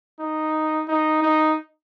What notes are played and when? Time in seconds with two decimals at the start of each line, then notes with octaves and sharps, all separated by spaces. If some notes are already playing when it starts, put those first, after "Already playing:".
0.19 D#4
0.88 D#4
1.22 D#4